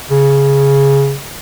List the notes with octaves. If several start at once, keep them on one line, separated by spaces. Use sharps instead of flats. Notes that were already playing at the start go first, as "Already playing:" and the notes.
C#3